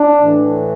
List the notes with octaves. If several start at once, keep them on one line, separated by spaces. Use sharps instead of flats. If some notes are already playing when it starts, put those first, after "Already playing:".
Already playing: D4
A2 E3